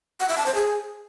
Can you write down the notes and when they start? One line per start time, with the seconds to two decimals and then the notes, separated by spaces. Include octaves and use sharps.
0.20 F#5
0.29 E5
0.37 A5
0.46 C5
0.55 G#4